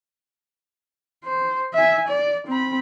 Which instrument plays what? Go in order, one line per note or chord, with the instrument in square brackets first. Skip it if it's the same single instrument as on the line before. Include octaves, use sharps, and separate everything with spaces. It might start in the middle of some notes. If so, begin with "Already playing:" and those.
[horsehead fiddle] C5
E5 G#5
D5
C4 B5